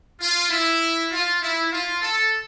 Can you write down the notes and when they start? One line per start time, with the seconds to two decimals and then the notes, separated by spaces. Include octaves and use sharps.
0.21 F4
0.51 E4
1.11 F4
1.42 E4
1.72 F4
2.02 A4